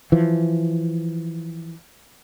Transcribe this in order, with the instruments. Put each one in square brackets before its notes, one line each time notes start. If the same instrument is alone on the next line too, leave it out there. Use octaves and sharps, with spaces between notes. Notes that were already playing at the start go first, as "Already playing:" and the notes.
[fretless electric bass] E3 F3